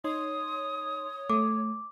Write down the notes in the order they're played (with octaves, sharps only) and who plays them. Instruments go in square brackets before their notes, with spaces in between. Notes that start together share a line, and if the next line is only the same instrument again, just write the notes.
[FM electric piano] D#4 C6 [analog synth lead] C#5 [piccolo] D#6
[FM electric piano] A3 [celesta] D6